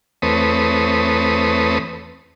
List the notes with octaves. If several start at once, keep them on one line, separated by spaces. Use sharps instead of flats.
E2 A3 C4 B4 C#5 D#6